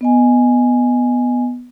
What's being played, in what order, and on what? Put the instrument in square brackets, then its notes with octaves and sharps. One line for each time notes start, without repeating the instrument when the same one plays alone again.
[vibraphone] B3 D#5 G#5